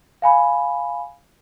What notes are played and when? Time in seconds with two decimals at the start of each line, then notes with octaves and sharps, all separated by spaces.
0.22 F5 G#5 B5